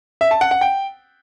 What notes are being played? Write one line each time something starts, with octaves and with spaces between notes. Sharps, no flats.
E5
A5
F#5
F#5
G5